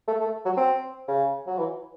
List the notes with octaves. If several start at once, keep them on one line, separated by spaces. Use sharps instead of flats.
A3
A3
F#3
C4
C#3
F#3
E3